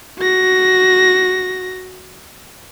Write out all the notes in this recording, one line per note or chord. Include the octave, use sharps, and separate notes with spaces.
F#4 A#6